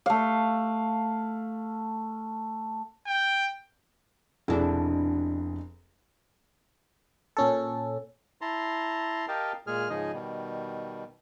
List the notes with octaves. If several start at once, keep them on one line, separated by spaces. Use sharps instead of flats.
A3 F5
G5
F1 B2 D4 E4 G#4
A#2 C#4 A4
E4 A5 A#5 C6
G4 A#4 D#5 F5 G5 A5
A#2 G#3 G#4 F6
G#2 C#3 F3 D#4 G#4 D#5
B2 D#3 G3